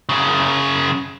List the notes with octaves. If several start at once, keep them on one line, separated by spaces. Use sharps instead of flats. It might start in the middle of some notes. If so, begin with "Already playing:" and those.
F#2 C#3